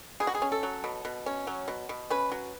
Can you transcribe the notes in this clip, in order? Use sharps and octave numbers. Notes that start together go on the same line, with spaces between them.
B2 G#4
F#4
G#4
C#4
A4
F#3
B2
B2
C#4
F#3
B2
B2
C#4 B4
F#3